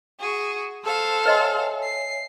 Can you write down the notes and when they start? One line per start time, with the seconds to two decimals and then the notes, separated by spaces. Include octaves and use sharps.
0.20 F#4 G#4
0.84 A4 C5 F5
1.26 B4 C#5 D#5 E5 G#5 C6
1.83 C7